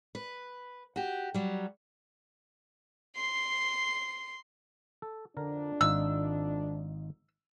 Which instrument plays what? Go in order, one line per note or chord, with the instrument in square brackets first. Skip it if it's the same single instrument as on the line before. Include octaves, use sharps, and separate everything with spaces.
[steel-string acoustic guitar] B4
F#4 G4
F#3 G3
[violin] C6 C7
[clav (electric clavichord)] A4
[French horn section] F2 D4 [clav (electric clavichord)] D3 A#4 A#5
[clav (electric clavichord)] G#1 D#4 F4 [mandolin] E6